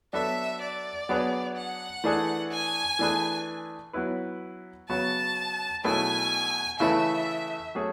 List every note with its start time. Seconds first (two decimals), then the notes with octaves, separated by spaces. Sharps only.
0.13 F#3 B3 D4 F#4 A4 E5
0.61 D5
1.09 F#3 B3 D4 G#4 B4
1.56 F#5
2.04 E3 A3 D4 G#4 B4
2.51 G#5
2.99 E3 A3 D4 G#4 B4
3.93 F#3 B3 E4 B4
4.89 C#3 F#3 B3 F#4 A5
5.84 B2 F#3 A3 E4 G#4 G#5
6.79 C#3 E3 A3 E4 A4 E5
7.75 F#3 A3 C#4 G#4